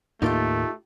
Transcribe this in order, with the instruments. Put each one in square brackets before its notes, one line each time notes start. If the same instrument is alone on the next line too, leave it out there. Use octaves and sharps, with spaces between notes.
[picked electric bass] D#2 A2 A#3 [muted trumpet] A3 [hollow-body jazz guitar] D#4 F4 G4